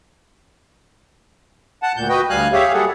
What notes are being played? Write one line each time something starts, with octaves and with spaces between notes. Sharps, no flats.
F#5 A5
D2 A#2 G6
F#4 B4 D#5 G5
D2 G3 F5 G#5 F#6
G4 G#4 C#5 E5 F5
F#3 G3 A#3 G#4 A4 F#5